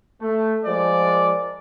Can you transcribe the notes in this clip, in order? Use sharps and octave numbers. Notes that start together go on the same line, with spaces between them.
A3
F3 G#3 A#4 D5